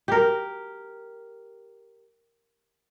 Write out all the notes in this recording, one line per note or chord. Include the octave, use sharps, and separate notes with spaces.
G4 A#4